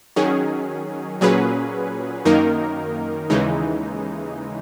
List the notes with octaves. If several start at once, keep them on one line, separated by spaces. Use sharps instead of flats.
D#3 F#3 C#4 G#4
A#2 F#3 C#4 G#4 B4
F#2 D#3 A#3 D#4 A#4
D#2 C#3 E3 G#3 D#4